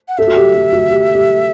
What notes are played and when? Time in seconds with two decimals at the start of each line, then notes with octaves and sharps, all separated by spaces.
0.08 F#5
0.18 A4 E5
0.27 F#4
0.36 G4
0.54 G4
0.72 F#4
0.91 G4
1.15 G4